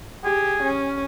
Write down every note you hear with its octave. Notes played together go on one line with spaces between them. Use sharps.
G4 G#4
C#4